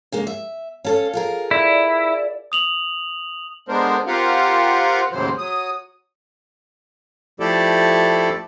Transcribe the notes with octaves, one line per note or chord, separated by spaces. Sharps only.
C#3 G#3 A#3
E5
C#4 A4 C#5 F5
F4 G#4 A#4
E4 D5
D#6 F7 F#7
D3 G#3 B3 D4 A#4 C5
C4 F4 G4 A#4 F5 F#5
D#2 A2 C#3 E3 F#3 C5
F#3 D#6
F3 A3 E4 G4 A4 D5